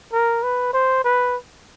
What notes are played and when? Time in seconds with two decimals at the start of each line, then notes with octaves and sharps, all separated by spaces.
0.13 A#4
0.43 B4
0.73 C5
1.04 B4